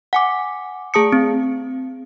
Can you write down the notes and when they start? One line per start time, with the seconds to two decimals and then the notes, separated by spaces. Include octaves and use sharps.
0.13 F#5 G#5 D6
0.94 A3 G#4 A5 D#6 C#7
1.13 C4